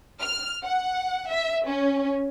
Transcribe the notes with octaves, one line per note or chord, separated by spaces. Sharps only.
F6
F#5
E5
C#4